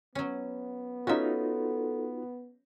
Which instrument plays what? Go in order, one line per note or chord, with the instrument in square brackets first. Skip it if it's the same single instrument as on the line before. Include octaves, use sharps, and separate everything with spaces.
[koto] F#3 C#4 [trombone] B3
[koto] C#4 E5 [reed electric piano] D#4 F4 F#4 [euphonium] A4